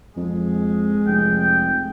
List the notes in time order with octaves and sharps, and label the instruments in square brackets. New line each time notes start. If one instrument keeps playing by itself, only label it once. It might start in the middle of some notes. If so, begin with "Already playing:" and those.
[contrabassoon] F2 [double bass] G#3
[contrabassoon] F1 [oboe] G5